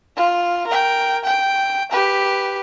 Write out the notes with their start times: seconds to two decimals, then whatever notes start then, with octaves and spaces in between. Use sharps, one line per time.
0.17 F4
0.67 A#4 G5
1.24 G5
1.92 G4 B4